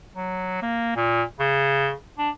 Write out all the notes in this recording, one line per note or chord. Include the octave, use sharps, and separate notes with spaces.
F#3
A#3
A#2
C#3
D4